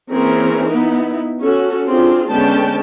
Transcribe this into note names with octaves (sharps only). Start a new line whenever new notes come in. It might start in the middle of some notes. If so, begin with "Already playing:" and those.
E3 A#3 C4 C#4 G#4 A#4
B3 D#4 E4
C#4 F#4 A4
C4 D4 F4 G#4
D3 G#3 B3 C#4 G5 A5